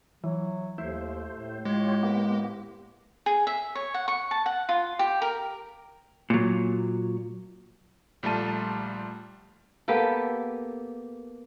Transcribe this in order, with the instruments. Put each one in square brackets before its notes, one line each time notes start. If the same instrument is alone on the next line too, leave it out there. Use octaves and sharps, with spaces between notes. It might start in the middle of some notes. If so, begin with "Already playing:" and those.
[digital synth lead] E3 [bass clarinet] F#3
[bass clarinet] D#2 [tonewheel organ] A3 C5 [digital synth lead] E4
[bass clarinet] A2
[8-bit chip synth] G#3 [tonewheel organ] F4 G4 C#5
[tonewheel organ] A#3 B3 G4
[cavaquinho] G#4
E5
C#5
F#5
C#6
A5
F#5
F4
G4
A#4
[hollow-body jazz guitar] A#2 F#3
[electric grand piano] A#1 G3 A3 F4 A5 D#7
[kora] A#3 B3 G4 A4